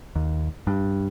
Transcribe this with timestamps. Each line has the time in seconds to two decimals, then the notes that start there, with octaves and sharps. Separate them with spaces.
0.15 D#2
0.67 G2